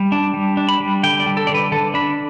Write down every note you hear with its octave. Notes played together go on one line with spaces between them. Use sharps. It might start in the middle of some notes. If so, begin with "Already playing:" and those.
Already playing: G3
D4
G3
D4
B5
G3
D3 G5
D5
G3
A4
D3 D5
B4
D3 A4
D4 B5